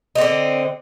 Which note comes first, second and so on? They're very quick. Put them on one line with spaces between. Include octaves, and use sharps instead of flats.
D#4 C4 D3